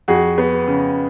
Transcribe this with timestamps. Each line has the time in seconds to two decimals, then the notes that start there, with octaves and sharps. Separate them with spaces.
0.08 F2 F#4 G#4
0.38 B3
0.67 C#3